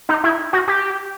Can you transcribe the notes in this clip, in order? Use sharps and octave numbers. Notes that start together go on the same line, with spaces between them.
D#4
E4
F#4
G4